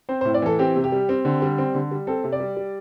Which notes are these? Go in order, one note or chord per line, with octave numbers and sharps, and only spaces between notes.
C4 C5
C5
A2
D5
E3 A4
C4 G4
C3
G4
G3
C4
D3
G3
C4
D3
G3
C4 A4
C3
D5
G3
G3